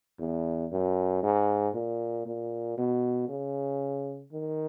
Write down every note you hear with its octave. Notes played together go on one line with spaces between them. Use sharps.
E2
F#2
G#2
A#2
A#2
B2
C#3
D#3